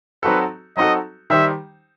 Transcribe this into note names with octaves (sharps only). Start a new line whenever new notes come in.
F#3 C4 D#4 F#4 A4 B4
F#3 C4 D#4 F#4 A4 D#5
D#3 G3 D#4 G4 C5 E5